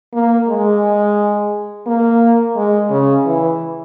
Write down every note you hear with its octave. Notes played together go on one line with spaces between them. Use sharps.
A#3
G#3
A#3
G#3
C#3
E3